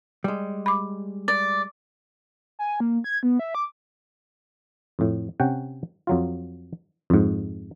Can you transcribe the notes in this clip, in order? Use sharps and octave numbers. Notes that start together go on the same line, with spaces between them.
G3 G#3
B5 D6
D5 A6
G#5
A#3
G#6
B3
E5
D6
F2 A2
C3 C#4 F#5 G5
F2 F#3 F4
F2 G#2